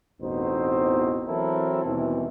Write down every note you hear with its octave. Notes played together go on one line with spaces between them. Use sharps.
A1 E2 B2 C4 D#4 C5
E3 F#3 C4 E4 A4 A#4
D#2 B2 E3 G3 C4